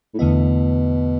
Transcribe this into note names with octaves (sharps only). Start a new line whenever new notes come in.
A2
E2 B2 D3 A3 E4